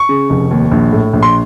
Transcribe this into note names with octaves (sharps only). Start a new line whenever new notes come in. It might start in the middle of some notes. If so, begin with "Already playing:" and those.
Already playing: C#6
C#3
F1
D#2
A#1
A2
A#1
C6